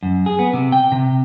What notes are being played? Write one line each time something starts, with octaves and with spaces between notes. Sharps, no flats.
F#2
G#4
B3
C3
G5
C3